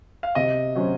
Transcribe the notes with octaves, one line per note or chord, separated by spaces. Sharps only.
F5
C3 D#5
F#3 C#4 F#4 C5